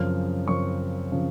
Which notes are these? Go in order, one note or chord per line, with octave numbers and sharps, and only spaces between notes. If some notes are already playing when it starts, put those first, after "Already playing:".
Already playing: F#2 C#3 F3 C4 F6
F#2 C#3 F3 C4 C#6
C#3 F3 C4